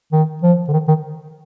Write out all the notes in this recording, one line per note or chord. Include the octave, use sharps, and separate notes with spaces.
D#3
F3
D3
D#3
D#3